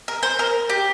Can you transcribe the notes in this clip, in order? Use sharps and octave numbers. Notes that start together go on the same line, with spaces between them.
A#4
C5
A#4
G4